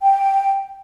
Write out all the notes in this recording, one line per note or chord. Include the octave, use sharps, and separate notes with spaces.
G5